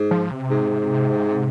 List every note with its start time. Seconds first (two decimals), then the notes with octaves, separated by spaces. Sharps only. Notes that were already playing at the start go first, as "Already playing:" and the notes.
Already playing: G#2
0.11 F3
0.31 C3
0.50 G#2